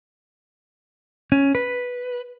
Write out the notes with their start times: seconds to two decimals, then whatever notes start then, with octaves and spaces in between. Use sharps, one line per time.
1.32 C#4
1.55 B4